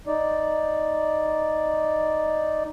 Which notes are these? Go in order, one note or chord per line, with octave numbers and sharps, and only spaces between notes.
D#4 D5